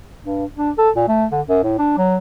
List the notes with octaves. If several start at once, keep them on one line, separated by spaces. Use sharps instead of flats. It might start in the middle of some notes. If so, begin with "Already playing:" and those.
G2
D4
A4
A#2
A3
D3
F#2
A2
D4
F#3